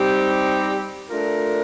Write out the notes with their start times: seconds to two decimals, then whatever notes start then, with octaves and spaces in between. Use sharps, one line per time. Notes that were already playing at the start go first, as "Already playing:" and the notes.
Already playing: G3 C4 D#4 G4
1.09 A3 D4 F4 A#4